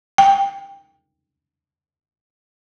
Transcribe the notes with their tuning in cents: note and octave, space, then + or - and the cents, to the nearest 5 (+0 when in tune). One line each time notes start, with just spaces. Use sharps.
G5 +15